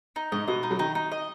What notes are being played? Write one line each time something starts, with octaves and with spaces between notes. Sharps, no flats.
D#4
G#2 D#5
B2 D#5
D#4
F#3
D#3 D#4
D#4
D#5